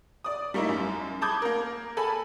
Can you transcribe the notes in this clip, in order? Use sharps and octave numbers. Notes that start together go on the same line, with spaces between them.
D5 D#6
G3 A3 A#3 D#4 E4
F#2
A5 B5 D6 D#6 G6 G#6
A#3 A#4
A4 G#5 B5